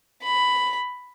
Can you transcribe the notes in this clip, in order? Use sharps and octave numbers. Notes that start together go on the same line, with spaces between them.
B5